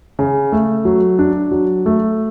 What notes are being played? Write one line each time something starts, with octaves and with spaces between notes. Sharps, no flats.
C#3
A3
F#3
D4
F#3
A3